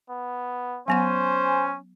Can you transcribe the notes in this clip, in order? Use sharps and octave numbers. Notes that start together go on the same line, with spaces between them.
B3
F#3 B3 C#4 C5 F#5 G#5